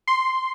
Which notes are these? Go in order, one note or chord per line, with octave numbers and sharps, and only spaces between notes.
C6